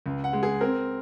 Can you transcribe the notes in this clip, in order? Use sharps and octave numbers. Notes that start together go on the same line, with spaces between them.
C#2
F#5
G#3
G#4
C4 A#4